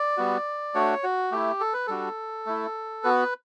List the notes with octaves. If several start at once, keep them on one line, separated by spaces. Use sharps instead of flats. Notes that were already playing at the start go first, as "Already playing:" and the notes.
Already playing: D5
G3 B3 F#4
A3 D4 F#4 C#5
F#4
A3 E4 G4
A4
B4
G3 D4 F#4 A4
A3 E4
B3 F#4 B4